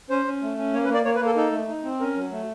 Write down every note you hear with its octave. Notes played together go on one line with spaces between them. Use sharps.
C#4 C5
C#4
A3
C#4
A#3 C#5
B4
A#3
D5
A#3 C#5
B4
A#3
A4
D#4 A4
A3
D#4
C4
C#4 A#4
F#3
A3